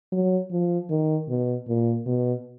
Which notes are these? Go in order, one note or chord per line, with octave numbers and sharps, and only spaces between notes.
F#3
F3
D#3
B2
A#2
B2